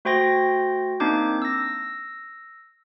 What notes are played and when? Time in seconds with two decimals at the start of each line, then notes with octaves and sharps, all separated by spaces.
0.05 A3 F#4 C5 G5 C6 A#6
1.00 A#3 C4 D4 D#4 D6 G6
1.42 E6 A#6